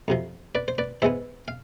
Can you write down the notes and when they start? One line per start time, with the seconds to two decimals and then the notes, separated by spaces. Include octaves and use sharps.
0.08 F2 C3 F3
0.55 B4 D5
0.68 C5
0.78 B4 D5
1.02 G#2 E3 G#3 B3 C5 E5
1.48 F5